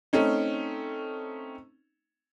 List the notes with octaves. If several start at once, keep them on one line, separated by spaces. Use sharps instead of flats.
A3 C4 C#4 D#4